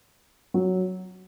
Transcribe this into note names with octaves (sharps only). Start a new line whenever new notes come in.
F#3